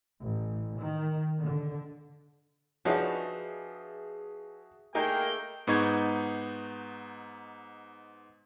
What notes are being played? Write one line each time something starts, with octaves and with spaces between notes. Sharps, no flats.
A1
D#3
D3
F3 D4 D#4 F#4 G#4 B4 C#5 E5
A3 A#3 D#4 G#4 A#4 G5
G#2 B3 D#4 C#6 G#6